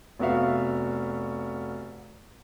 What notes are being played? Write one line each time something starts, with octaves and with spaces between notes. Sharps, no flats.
F1 B3 F#4 E5 F5